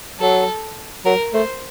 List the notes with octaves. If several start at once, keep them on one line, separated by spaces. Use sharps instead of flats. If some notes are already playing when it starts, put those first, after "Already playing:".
F#3 A4
F#3 A#4
A3 C5